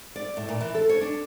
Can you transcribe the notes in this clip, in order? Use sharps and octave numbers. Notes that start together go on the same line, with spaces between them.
D5
A2
A#2
E3
A4
C#5
D4